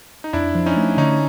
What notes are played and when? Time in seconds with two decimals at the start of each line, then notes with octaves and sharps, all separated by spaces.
0.24 D#4
0.33 F2 D4 E4
0.55 F3
0.66 C#4 D#4
0.76 A3
0.97 D3 C#4 D#4